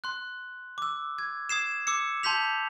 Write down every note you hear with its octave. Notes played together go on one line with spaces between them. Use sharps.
C6 F#6
D6 E6
G#6
D#6 G#6 C7 E7
D6 E6 C#7
A5 C6 G6 B6 F7